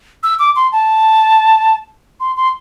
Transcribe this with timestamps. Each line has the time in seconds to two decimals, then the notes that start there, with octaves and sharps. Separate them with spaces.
0.23 E6
0.39 D6
0.56 C6
0.72 A5
2.20 C6
2.36 C6